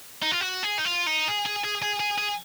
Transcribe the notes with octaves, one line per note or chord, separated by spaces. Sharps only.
D#4
F4
F#4
G#4
D#4
F4
D#4
G#4
G#4
G#4
G#4
G#4
G#4